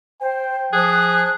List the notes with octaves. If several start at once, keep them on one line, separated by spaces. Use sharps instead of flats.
C5 G5
F3 G#4 F#6